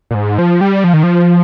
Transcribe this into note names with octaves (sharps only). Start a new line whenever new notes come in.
A#2
G#2
F3
G3
F3
D#3
F3